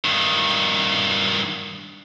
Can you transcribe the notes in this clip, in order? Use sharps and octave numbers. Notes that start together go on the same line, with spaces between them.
G2 D#3